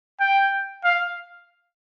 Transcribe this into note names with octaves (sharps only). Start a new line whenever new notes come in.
G5
F5